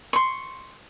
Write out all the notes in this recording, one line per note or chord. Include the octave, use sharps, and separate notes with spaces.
C6 C#6